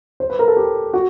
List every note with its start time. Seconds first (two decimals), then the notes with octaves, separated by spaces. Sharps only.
0.20 C5
0.30 B4
0.39 A#4
0.48 A4
0.57 G4
0.94 F#4